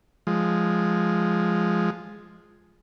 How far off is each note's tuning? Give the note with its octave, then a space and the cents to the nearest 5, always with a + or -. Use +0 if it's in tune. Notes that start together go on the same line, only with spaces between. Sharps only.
F3 +0 G#3 +0